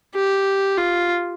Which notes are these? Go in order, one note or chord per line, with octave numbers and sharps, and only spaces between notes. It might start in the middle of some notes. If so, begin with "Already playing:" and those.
G4
F4